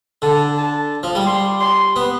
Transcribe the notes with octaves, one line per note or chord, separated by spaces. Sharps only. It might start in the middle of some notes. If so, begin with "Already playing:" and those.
D3 A5
A5
F3
G3
C6
C6
B3